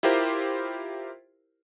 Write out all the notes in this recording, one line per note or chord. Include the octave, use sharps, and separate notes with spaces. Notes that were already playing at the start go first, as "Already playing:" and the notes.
E4 F4 G4 A#4 C5